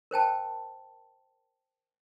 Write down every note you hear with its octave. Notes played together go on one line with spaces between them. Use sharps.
A#4 C5 G5 A5